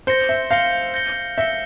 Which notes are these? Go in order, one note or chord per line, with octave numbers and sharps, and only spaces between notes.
C5 G6 A#6 C#7 G7
E5
F5 G6 A#6 C#7 G7
G6 A#6 C#7 G7
E5 G6 A#6 C#7 G7